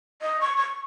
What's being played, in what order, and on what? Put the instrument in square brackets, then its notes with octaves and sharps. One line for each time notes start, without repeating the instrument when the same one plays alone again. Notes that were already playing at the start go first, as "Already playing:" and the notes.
[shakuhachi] D#5
C#6
C#6